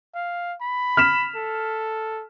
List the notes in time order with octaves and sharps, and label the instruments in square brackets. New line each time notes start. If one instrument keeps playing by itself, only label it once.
[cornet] F5
B5
[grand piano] F6 B6 E7
[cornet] A4